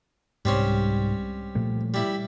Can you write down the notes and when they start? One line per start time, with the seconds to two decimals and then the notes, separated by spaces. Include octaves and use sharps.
0.45 C2 G#2 G3 C4 C#4
1.55 A#2 F3 A3
1.94 G3 E4